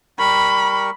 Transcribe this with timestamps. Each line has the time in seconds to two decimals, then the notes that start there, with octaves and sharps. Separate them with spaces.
0.19 G3 A#4 B5 C#6